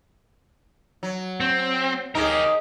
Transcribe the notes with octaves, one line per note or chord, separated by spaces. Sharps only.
F#3
C4
D#4 G4 G#4 A#4